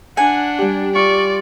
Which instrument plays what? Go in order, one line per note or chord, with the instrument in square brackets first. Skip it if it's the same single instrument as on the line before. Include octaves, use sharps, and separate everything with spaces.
[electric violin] D4 [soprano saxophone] F#5 [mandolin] G#5
[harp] G3 G4
[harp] F4 [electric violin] D5 [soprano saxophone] C#6